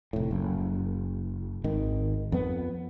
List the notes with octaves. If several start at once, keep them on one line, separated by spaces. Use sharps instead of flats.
F1 A2
F#1
G#1 D#3
F2 B3